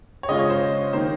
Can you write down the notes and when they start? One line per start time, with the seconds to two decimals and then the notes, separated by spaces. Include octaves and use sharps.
0.23 C#5
0.28 C#3 G#3 C#4 F4 D#5
0.39 C#5
0.50 C5
0.93 D#3 A#3 D#4 C5